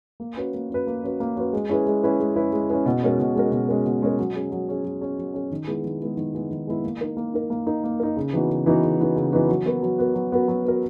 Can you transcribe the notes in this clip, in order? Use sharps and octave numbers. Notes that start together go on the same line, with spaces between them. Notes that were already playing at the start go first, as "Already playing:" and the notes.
A#3
C#4 F#4 B4
A#3
C#4 F#4 B4
A#3
C#4 F#4 B4
A#3
C#4 F#4 B4
G#3
C#4 E4 G#4 B4
G#3
C#4 E4 G#4 B4
G#3
C#4 E4 G#4 B4
G#3
C#4 E4 G#4 B4
B2
G#3 C#4 F#4 A#4
B2
G#3 C#4 F#4 A#4
B2
G#3 C#4 F#4 A#4
B2
G#3 C#4 F#4 A#4
F#3
C#4 G#4
F#3
C#4 G#4
F#3
C#4 G#4
F#3
C#4 G#4
D#3
G#3 B3 E4 G#4
D#3
G#3 B3 E4 G#4
D#3
G#3 B3 E4 G#4
D#3
G#3 B3 E4 G#4
A#3
D#4 A#4
A#3
D#4 A#4
A#3
D#4 A#4
A#3
D#4 A#4
C#3
E3 B3 D#4 F#4
C#3
E3 B3 D#4 F#4
C#3
E3 B3 D#4 F#4
C#3
E3 B3 D#4 F#4
F#3
B3 F#4 A#4
F#3
B3 F#4 A#4
F#3
B3 F#4 A#4
F#3
B3 F#4 A#4